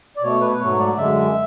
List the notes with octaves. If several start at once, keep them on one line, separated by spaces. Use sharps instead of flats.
D5
B2 A3 C#5
B4
G#2 F#3 A3 C#5
D5
F#2 D3 G#3 E5